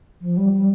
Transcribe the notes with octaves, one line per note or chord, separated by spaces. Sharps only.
F3
G3
G3